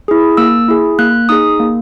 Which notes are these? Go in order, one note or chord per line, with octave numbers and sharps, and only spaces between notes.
E4 G#4
A#3 E6
E4 G#4
A#3 F#6
D#4 G#4 D#6
A#3